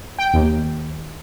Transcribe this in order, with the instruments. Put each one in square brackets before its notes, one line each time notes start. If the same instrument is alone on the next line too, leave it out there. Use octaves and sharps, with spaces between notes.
[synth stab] G5
D#2